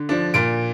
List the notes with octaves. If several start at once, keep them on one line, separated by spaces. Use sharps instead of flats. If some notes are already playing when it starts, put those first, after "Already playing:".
Already playing: D3
F3 D4
A#2 D7